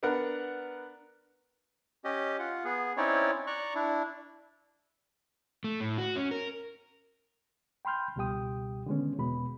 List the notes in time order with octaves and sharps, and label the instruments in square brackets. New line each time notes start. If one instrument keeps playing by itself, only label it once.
[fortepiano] B3 D4 A#4 B4 F#5
[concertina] C#4 G4 D#5
F4 F#5
B3 G#4
C4 C#4 D#4 E4 C#5 D5
D5 A#5 C#6 F#6
D4 E4
[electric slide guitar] A3
A2
F#4
C#4
A#4
[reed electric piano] G5 B5 C6 F6 G6
C#2 B2 G3 G4 G5 D#6
D3 D#3 G#3 B3 C#4
E2 B2 G#3 B3 B5